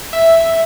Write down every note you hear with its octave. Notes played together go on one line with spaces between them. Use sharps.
E5